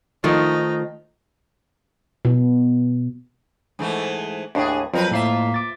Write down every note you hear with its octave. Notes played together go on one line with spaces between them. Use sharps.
D#3 F3 A3 D#4
B2
G#2 E3 A3
D#2 A2 D4 G#4
F2 F3 F#3 C4 A#4 B4
A2 A#3 F4 E5 C7
D6 A6